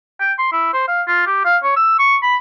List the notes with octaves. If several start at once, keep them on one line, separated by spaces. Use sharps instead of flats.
G5
C6
E4
C5
F5
F4
G4
F5
C#5
E6
C#6
B5